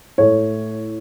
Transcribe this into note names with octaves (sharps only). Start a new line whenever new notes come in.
A2 A3 C#5